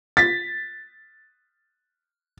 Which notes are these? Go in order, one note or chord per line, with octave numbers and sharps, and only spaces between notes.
A6 B6